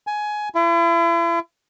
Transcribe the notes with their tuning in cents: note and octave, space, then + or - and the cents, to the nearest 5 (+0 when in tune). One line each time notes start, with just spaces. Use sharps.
G#5 +15
E4 +40